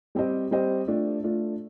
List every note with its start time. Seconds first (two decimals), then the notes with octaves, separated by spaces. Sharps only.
0.15 G3 C4 G4 C5 D#5
0.51 G3 C4 G4 C5 D#5
0.87 A3 D4 F4
1.24 A3 D4 F4